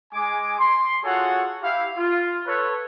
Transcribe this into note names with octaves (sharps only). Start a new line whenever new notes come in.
G#3 G#5 D6
C6
F4 F#4 G#4 A4 C#5 F#5
E4 G4 F5
F4
A4 B4 C#5